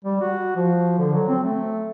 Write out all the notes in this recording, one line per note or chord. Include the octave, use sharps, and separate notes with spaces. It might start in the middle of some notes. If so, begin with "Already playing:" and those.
G3
F#4
F3
D3
F#3
C4
A3